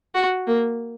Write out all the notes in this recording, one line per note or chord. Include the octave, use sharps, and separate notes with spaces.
F#4
A#3